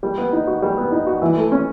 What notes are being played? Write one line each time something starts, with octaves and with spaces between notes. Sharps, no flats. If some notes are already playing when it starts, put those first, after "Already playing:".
G3
B3
D#4
F#4
G3
B3
D#4
F#4
E3
A3
C#4